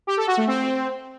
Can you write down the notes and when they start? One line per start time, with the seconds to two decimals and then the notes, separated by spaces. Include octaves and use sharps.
0.07 G4
0.17 A4
0.27 F#4
0.37 A3
0.47 C4